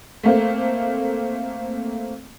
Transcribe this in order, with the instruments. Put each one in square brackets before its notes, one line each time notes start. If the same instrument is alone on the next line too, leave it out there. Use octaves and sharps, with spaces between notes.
[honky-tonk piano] A3 A#3 C4